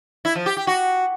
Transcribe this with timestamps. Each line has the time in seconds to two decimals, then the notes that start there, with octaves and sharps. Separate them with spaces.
0.25 E4
0.35 F3
0.46 G4
0.57 G4
0.67 F#4